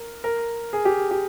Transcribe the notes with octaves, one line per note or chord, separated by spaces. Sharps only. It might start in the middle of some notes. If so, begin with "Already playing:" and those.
Already playing: A#4
A#4
G#4
G4
G4